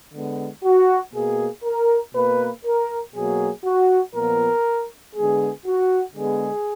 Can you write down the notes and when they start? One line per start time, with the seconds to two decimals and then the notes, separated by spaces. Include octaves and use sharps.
0.14 D3 G#3 B3
0.65 F#4
1.14 B2 A#3 G#4
1.64 A#4
2.15 B2 A#3 B4
2.66 A#4
3.15 B2 F#3 A#3 G#4
3.65 F#4
4.15 A#2 F3 B3 A#4
5.15 D3 G#3 B3 G#4
5.66 F#4
6.16 D3 G#3 B3 G#4